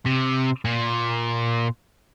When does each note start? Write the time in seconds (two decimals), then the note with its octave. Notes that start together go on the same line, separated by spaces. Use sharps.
0.06 C3
0.65 A#2